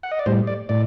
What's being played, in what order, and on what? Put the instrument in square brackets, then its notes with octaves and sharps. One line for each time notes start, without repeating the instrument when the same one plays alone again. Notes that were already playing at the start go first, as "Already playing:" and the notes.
[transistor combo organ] F#5
D#5
D5
A2 G3 C5
D5
A2 D5